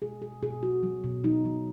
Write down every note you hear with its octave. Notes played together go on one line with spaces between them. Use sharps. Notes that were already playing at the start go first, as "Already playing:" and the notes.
B2 G#4
B2 G#4
B2 G#4
F#3 F#4
F#3
B2
F#3 D#4
F#3